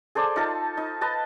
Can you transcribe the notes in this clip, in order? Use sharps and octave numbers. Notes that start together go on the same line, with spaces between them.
G#4 A4 C5 D5
D#4 F4 A4 A5
D#4
B4 D#5 A5